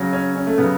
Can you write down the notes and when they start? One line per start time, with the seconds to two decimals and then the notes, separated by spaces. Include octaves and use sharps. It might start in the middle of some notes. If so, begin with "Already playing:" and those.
Already playing: C#3 F#3
0.13 C#4
0.35 C#4
0.47 A3
0.58 C#3 F#3 B3